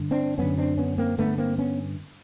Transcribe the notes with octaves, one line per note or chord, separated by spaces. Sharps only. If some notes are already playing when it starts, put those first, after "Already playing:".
Already playing: G2 D3
C4 D4
F#2 D3 B3 C#4
C4 D4
B3 C#4
A#3 C4
G2 D3 A3 B3
A#3 C4
B3 C#4